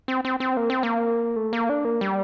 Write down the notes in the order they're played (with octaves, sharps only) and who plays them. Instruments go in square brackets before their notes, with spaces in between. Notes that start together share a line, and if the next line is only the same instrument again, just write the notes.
[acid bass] C4
C4
C4
A#3
C4
A#3
A3
A#3
D4
A#3
G3